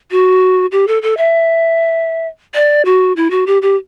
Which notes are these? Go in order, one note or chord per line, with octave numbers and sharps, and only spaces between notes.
F#4
G4
A4
A4
E5
D5
F#4
E4
F#4
G4
G4